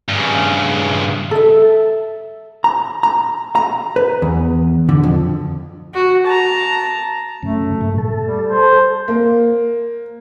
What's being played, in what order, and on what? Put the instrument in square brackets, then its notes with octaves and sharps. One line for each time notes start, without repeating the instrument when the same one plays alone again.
[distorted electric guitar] G2 C#3
[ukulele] A4 E5
[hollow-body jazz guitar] A#5
A#5
A#5
B4
E2
D3
F2
[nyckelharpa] F#4
A5 A#5
[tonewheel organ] F#2 C#3 [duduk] A3
[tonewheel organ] G2 A#2
A4
[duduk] G3
C5
[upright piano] A#3